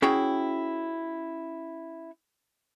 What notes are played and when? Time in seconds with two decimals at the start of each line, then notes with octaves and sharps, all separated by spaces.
0.02 C#4 E4 F#4 G#4 C#5 G5